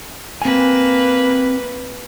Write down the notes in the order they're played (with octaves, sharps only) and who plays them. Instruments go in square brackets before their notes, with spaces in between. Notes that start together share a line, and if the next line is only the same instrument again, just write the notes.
[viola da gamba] A#3 B4 [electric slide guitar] C4 G#5